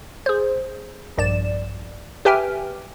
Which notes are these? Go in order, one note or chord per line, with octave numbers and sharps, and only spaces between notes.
G#4 C5
A#1 G2 D5 E7
G4 B4 E5 G5 G#5 F6